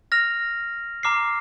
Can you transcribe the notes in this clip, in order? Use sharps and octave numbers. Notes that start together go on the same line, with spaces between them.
F6 A#6 F7
A#5 D6 F6 C7